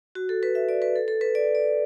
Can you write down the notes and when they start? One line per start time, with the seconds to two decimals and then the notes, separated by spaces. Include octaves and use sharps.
0.15 F#4
0.29 A4
0.43 B4
0.55 E5
0.69 D5
0.82 B4
0.96 A4
1.08 A4
1.21 B4
1.35 D5
1.55 D5